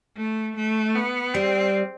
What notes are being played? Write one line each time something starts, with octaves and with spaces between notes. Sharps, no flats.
A3
A3
B3
G3 C4